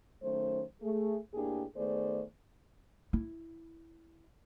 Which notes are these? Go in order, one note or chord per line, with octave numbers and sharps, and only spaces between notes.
D#3 F#3 A3 C#4 C5
A3 G#4
A2 A#3 D4 G4 G#4
D#3 A3 B3 G#4 C5 D5
E4